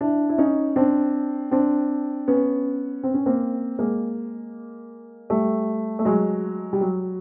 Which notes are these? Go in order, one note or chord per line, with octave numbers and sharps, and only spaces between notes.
D4 E4
E4
C#4 D#4
C4 D4
C4 D4
B3 C#4
C4
C#4
A#3 C4
G#3 A#3
G3 A3
A3
F#3 G#3
G3
F#3